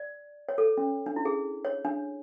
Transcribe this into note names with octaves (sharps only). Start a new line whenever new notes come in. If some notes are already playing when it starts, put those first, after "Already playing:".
Already playing: D5
C#5
A4
C#4
D4
E4
G#4
C#5
D4